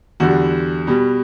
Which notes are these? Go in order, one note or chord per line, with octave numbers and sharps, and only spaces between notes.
E2 D3 G3 F#4
B2 G3